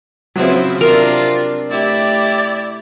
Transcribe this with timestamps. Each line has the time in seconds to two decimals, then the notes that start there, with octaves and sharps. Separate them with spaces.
0.36 C#3 F3 F#3 C4 E4
0.81 C3 D4 F4 A#4
1.69 A3 E4 G4 D5